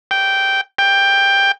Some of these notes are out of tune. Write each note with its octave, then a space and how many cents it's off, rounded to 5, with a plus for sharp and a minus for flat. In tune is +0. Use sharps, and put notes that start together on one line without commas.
G5 -10
G5 +10